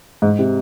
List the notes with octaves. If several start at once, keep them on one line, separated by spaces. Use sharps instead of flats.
G#2
C3